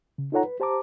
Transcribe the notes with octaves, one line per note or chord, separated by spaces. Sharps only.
C#3
D#4 F4 A4 C#5 F#5 A#5
B4
G4 C5 A5 A#5 D6